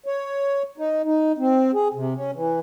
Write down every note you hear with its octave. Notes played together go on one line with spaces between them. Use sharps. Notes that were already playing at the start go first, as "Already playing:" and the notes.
C#5
D#4
D#4
C4
G#4
C3
C#4
E3